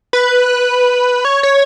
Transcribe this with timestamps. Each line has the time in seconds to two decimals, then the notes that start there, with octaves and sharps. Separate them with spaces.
0.13 B4
1.25 C#5
1.43 C#5